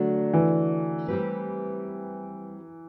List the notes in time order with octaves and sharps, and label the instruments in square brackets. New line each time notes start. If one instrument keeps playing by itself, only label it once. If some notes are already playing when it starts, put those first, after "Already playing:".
Already playing: [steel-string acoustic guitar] D3 A3 D4 F#4 [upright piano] F#3
[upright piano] E3
[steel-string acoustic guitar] G3 C4 G4 B4